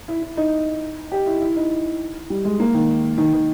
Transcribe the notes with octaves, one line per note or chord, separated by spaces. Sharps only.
E4
E4
D#4
G4
E4
E4
D#4
G3
G#3
A#3
D#3
D#3
D#3